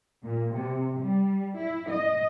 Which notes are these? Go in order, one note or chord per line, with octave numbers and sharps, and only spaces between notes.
A#2
C3
G3
E4
D#5